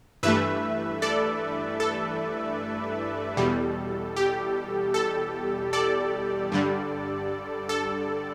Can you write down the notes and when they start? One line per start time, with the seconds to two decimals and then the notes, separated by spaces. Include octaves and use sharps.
0.23 G2 E3 A3 B4 E5
1.02 A4 D5
1.80 A4
3.37 E2 B2 G3
4.16 G4
4.94 A4
5.73 A4 D5
6.52 G2 D3 G3
7.69 A4